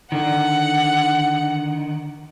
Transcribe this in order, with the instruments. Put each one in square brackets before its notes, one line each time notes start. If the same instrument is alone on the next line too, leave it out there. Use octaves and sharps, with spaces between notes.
[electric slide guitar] D3 D#3 [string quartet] F#5